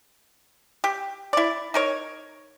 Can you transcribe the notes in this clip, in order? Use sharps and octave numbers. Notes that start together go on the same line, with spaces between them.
G4
E4 D5
D#4 A#4 C#5